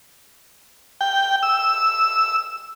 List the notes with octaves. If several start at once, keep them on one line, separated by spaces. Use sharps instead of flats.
G5
E6